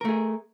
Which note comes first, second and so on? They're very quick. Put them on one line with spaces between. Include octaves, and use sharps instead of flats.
A#4 A3 G#4